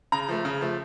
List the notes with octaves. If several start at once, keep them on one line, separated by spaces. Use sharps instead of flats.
C#3 A#5
F3 A3
C#3
F3 A3